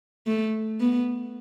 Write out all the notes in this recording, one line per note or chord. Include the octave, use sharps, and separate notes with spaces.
A3
B3